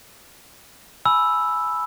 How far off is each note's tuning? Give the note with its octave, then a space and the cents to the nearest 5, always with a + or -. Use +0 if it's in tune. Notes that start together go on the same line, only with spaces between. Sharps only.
G#5 +20 B5 +0 E6 +0